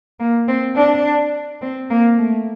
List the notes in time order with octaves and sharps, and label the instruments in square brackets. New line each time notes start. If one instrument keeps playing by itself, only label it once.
[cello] A#3
C4
D4
C4
A#3
A3